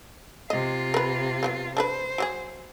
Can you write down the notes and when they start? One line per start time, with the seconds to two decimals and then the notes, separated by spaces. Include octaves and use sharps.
0.50 C3 F4 D#5
0.94 A#4 B4
1.43 F#3 A3 B3
1.77 D4 A4 B4 C5
2.18 F#3 G4 G#4